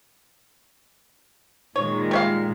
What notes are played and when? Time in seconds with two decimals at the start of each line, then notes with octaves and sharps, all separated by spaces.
1.76 A#2 D#3 G#3 C#5
2.11 G3 C#5 F5